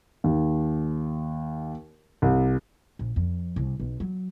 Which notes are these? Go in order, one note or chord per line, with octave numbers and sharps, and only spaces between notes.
D#2
C2
A#1
F2
C2
B1
F#3